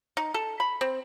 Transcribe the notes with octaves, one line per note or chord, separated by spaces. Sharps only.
D#4
A4
B5
C4